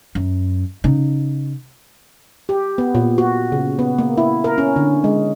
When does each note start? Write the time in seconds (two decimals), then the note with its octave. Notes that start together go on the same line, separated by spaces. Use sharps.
0.15 F#2
0.84 C#3 D#4
2.49 G4
2.78 B3
2.95 A#2
3.18 F#4
3.52 C#3
3.79 B3
3.98 A#3
4.18 E4
4.44 A#4
4.58 C#4
4.76 D3
5.04 G#3